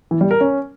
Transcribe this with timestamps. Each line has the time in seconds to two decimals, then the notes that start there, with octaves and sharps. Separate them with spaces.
0.11 E3
0.21 G3
0.31 A#4
0.41 C#4